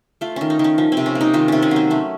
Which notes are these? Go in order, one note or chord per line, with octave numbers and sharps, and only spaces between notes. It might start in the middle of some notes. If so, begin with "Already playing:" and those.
A3 F4
D#3 C#4
D#4
D#3
C#4
F3 C#4
C4
C3
C#4
A#3
D#4
D#3 F4
C3 C#4
C#4
F#3 C4
A3 C#4